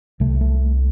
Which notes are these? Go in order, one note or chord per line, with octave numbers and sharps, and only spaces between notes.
C2 C3 A3
A3